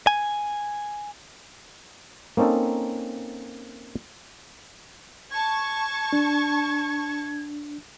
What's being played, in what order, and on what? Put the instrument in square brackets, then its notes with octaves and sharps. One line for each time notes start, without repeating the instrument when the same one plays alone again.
[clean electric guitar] G#5
[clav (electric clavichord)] A#3 C4 C#4 D#4 A4
[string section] A5 C#6 [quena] G#6
[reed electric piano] D4